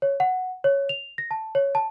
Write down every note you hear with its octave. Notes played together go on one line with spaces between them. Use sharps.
C#5
F#5
C#5
F7
A#6
A5
C#5
A5